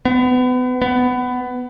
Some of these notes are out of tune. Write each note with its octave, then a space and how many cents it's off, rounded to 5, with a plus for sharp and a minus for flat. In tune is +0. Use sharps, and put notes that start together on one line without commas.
B3 +30
B3 +15